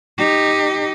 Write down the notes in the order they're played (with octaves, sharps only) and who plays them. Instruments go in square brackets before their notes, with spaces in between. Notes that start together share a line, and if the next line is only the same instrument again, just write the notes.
[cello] D#4 G4